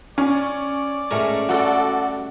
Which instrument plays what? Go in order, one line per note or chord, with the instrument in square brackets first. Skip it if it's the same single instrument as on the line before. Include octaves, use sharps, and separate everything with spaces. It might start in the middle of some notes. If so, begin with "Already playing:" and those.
[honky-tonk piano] C#4 [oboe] D5
[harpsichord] G#2 G#5 A#5 [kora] A3 C#4 A#4
[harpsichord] G3 [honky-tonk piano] F#4 A4